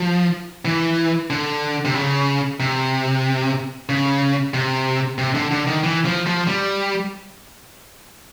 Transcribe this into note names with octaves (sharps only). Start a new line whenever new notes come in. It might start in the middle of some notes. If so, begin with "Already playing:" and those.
Already playing: F3
E3
D3
C3
C#3
C3
C#3
C3
C3
D3
D3
D#3
E3
F3
F3
G3